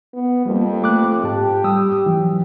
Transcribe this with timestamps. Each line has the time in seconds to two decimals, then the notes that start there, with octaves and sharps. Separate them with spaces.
0.14 B3
0.46 F2 G3 A#3
0.83 A3 D6 F#6
1.24 G#2 G4 A5
1.64 G3 D#6 E6
2.06 E3 F#3